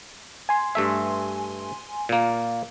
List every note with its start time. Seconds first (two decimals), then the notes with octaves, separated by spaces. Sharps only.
0.49 G#5 C6
0.75 G2 A3 E5
2.09 A#2 A#3